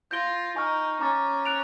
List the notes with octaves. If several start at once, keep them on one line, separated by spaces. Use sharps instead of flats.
F4 G6 A#6 D7 G7
D#4 G#5 C#6 F6
C#4 A#5 D6 F6 A6
F#6 A6 D7 F7